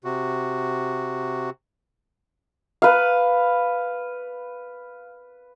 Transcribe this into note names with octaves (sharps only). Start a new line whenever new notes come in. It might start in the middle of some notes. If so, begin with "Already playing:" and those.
C3 F#4
B4 F5